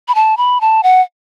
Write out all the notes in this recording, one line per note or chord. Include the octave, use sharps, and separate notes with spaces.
B5
A5
B5
A5
F#5